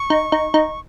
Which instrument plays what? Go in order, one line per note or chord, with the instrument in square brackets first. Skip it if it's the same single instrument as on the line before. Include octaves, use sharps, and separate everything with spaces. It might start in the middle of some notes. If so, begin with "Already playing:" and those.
Already playing: [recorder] C#6
[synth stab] D#4
D#4
D#4